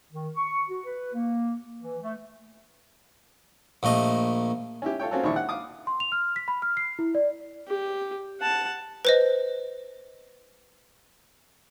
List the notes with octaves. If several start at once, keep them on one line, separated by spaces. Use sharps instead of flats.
D#3
C#6
F#4
B4
A#3
E3
A3
A#1 A#2 A3 D#5
C#4 E4 G4
F4 A4 C#5 G5
A#3 C4 C#4 F4 F#4 A4
A#1 D#2 D#3 D4 E4 C#6
F#5
F5 D6 D#6
C6
F7
F6
B6
B5
F6
C7
E4
D5
G4
F#5 A5
B4 C5 D#5